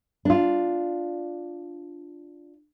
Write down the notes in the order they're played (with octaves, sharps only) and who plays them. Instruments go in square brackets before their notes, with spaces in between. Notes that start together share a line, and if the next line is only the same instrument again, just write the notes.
[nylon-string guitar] D4 F4